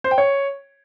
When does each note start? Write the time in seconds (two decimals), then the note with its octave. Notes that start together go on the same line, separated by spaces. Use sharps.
0.04 C5
0.11 G5
0.18 C#5